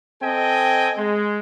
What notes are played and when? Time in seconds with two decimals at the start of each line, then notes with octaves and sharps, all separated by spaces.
0.22 C4 A4 D#5 G5 G#5
0.98 G#3